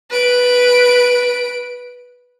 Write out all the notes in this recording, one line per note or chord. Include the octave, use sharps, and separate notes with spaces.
B4 D7